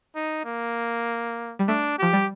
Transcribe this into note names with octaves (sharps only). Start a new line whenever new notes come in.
D#4
A#3
G3
A3 D4
F3 G4
G3